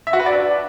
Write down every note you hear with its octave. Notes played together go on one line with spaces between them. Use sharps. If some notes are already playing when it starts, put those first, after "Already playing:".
E5
F#4
B4
D5
D4